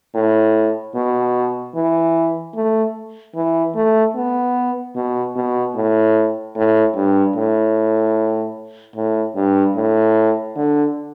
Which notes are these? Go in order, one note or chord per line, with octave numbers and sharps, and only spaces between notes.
A2
B2
E3
A3
E3
A3
B3
B2
B2
A2
A2
G2
A2
A2
G2
A2
D3